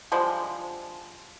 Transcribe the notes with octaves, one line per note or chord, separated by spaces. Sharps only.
D3 F3 G3 G#3